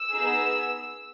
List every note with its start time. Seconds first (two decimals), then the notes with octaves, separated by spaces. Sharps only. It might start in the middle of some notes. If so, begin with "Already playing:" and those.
Already playing: E6
0.13 B3 D#4 G#4